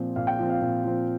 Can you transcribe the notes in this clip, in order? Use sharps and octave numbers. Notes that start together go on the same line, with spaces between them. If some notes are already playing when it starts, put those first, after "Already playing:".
Already playing: A#2 F3 C4
A#2 F5
G5
F3 C4
F5
A#2
F3 C4